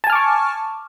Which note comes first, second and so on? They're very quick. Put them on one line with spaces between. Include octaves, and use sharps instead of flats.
A5 G#5 F6 D6 C#6